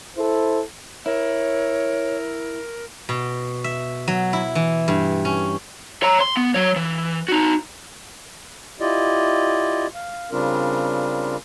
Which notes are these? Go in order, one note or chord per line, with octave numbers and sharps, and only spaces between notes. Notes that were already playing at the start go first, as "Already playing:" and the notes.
E4 A4 C5
E4 A#4 C#5
B2
E5
F#3
E4
E3
G2
C#4
C#5 A#5
C6
B3
F#3 C#5
E3
D#4 F#4
E4 F4 G4 D5 D#5
F5
C#3 G3 C4 D4 F4 A#4